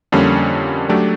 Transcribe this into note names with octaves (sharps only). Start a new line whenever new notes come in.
F2 D3 G3 A#3 C#4
F#3 A3 D4 G4